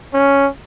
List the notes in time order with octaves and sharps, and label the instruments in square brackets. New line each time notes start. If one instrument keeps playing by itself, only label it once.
[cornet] C#4